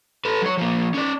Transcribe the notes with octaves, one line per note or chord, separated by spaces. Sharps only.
A4 B4
F#3 C#5
F3 A#3
C#4 D5